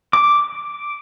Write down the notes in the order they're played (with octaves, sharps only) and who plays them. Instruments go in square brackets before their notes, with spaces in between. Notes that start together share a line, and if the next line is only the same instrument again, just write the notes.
[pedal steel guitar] D6